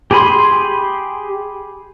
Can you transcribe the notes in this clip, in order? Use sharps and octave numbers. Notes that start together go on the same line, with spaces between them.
G4 G#4 G#5 B5 C6